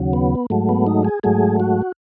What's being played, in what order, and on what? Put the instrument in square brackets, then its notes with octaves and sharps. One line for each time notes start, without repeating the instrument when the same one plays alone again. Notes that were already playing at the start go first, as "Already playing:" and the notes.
Already playing: [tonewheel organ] D#2 C#3 F#3
B3
G#2 F#3 A3
B3
D#4
G#4
G#2 F#3 A3 G#4
F#4